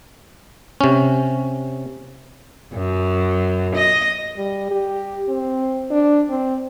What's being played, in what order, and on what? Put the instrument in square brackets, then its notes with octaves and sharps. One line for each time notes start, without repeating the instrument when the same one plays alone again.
[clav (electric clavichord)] C3 C#4
[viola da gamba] F#2
D#5
[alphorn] G3
G4
C4
D4
C4